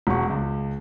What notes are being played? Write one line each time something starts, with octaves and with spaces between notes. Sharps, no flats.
E1 F#5 C#6
C#2